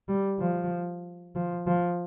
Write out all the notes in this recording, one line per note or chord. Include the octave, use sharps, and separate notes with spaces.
G3
F3
F3
F3